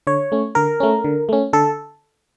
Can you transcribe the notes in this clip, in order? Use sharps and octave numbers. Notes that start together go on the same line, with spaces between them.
D3 C#5
A3 C#4
D3 A#4
A3 C#4
D3
A3 C#4
D3 A4